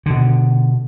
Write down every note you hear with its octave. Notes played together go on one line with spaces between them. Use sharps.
B2 D3